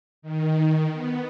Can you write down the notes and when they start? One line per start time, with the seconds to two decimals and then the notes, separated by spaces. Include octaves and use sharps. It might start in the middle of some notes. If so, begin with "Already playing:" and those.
0.22 D#3
0.93 B3